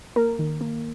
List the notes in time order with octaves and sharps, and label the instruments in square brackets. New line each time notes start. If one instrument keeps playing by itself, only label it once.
[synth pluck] A#3 A#4
D#3
A#3